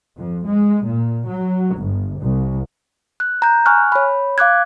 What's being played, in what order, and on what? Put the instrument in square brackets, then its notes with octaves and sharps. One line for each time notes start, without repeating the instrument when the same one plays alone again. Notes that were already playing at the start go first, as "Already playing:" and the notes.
[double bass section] F2
G#3
A#2
F#3
G1
C2
[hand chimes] F#6
A#5 G6
G#5 C#6 F6 F#6
C#5 B5
F5 D6 F#6 G#6